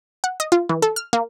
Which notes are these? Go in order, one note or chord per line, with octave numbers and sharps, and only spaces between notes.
F#5
D#5
F4
E3
A4
F6
A#3